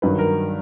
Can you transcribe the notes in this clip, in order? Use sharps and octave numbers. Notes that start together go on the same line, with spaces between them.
G2 D#3 F#3 B4
A#4